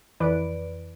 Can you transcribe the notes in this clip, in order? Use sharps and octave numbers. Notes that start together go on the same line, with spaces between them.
F2 E3 B4 D5 D7